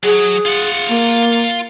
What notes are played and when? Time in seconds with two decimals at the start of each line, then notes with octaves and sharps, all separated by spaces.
0.04 F#3 G#4
0.46 F4 F#5
0.88 A#3